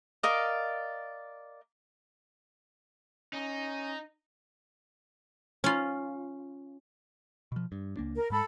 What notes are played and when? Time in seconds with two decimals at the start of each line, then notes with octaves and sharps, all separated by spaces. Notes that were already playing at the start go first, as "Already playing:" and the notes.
0.23 A#4 D5 D#5 F5
3.33 C#4 D#4
5.64 C#4 F4
7.52 B2 F3
7.72 G2
7.97 C#2 A#3 D4
8.15 A#4
8.30 G#2 G#3 A4 B5